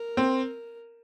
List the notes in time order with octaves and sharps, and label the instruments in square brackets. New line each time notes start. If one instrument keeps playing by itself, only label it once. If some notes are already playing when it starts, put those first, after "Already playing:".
Already playing: [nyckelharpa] A#4
[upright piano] C4